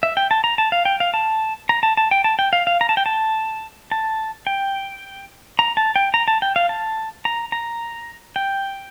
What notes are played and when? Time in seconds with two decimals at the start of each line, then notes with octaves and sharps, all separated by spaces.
0.03 E5
0.17 G5
0.31 A5
0.44 A#5
0.58 A5
0.72 F5
0.85 G5
1.00 F5
1.14 A5
1.69 A#5
1.83 A5
1.97 A5
2.11 G5
2.24 A5
2.39 G5
2.53 F5
2.67 F5
2.81 A#5
2.89 A5
2.97 G5
3.06 A5
3.92 A5
4.47 G5
5.59 A#5
5.77 A5
5.96 G5
6.14 A#5
6.28 A5
6.42 G5
6.56 F5
6.69 A5
7.25 A#5
7.52 A#5
8.36 G5